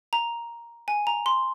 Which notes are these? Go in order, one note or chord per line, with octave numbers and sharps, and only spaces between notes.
A#5
G#5
A#5
C6